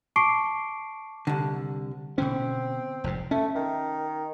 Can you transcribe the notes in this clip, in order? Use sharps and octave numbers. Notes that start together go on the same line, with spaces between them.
A5 C#6 D6 C7 D7
C2 D3
B2 D3 C4 C#4
F1 F2 G#2
A3 C#4
D#3